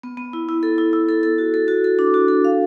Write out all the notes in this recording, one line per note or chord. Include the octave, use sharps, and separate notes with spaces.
B3
B3
E4
E4
A4
E4
E4
A4
A4
F#4
A4
F#4
A4
D4
F#4
A4
F5